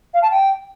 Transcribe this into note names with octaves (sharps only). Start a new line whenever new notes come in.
F5
A5
G5